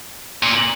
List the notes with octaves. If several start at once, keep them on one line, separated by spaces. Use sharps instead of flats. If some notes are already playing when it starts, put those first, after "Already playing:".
A#2